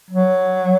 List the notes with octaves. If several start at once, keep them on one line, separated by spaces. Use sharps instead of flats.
F#3